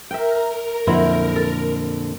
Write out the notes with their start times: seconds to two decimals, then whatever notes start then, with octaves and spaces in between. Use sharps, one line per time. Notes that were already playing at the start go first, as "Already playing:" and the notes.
0.11 A#4 E5 G5
0.87 F2 A#2 D3 F#3 E4 C5
1.36 A4